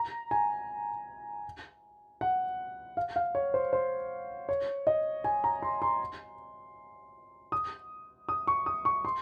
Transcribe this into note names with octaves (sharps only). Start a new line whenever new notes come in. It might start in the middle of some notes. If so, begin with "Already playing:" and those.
Already playing: A#5
G#5
F#5
F5
F5
C#5
C5
C5
C#5
D#5
G#5
A#5
C6
C6
D#6
D#6
C#6
D#6
C#6
C6